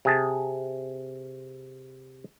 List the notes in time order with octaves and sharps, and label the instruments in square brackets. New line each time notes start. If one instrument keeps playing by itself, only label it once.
[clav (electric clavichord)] C3 G#4 A5